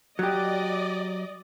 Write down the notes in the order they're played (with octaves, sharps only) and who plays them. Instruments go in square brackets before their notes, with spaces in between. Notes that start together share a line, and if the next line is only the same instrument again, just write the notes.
[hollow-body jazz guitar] F#3 G4 [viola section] D5 D#5